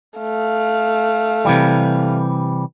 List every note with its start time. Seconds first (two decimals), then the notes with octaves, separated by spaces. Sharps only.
0.19 A3 F5
1.45 C3 E3 G3